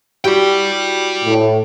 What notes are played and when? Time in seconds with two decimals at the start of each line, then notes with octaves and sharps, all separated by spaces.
0.24 E4 F#4 G4 D5 G5
1.25 A2